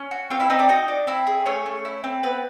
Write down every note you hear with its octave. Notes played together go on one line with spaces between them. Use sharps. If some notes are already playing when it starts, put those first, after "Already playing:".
Already playing: C#4
F#4
C4 F4 F5
E4 E5
C4 D#4 D#5
D4 D5
D#4 F#4 D#5
D4
C4 E4 E5
G#4
A3 C#4 C#5
A3
E4
C4
B3 C4 B4